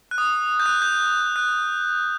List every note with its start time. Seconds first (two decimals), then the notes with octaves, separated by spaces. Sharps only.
0.11 F#6
0.18 D#6
0.60 G6
0.66 F#6
0.82 G6
1.36 F#6